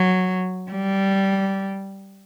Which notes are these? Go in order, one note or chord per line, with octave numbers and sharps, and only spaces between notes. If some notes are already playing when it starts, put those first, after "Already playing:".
Already playing: F#3
G3